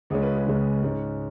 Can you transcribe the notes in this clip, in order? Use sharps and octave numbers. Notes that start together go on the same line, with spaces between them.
C#2 C#3 G#3 C#4 G#4
B4
G#4
C#2 C#3 G#3 C#4
G#2 G#3 C#4